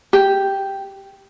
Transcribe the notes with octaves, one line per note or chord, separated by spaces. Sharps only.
G4